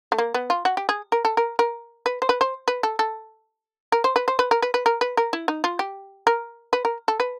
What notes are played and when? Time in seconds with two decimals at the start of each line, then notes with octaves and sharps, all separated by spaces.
0.12 A3
0.18 A#3
0.34 B3
0.50 F4
0.65 F#4
0.77 G4
0.89 G#4
1.12 A#4
1.25 A4
1.37 A#4
1.59 A#4
2.06 B4
2.22 C5
2.29 B4
2.41 C5
2.68 B4
2.83 A4
2.99 A4
3.92 A#4
4.04 C5
4.16 B4
4.28 C5
4.39 B4
4.51 A#4
4.62 B4
4.74 B4
4.86 A#4
5.01 B4
5.17 A#4
5.33 E4
5.48 D#4
5.64 F4
5.79 G4
6.27 A#4
6.73 B4
6.85 A#4
7.08 A4
7.20 B4